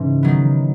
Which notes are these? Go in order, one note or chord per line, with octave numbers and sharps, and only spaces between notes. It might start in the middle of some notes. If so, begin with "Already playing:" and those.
Already playing: G#2 C#3 E3
D#3 F#3 B3